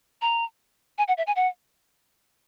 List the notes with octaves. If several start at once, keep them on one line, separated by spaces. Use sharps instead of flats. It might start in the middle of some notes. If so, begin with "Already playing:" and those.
A#5
G#5
F#5
E5
G#5
F#5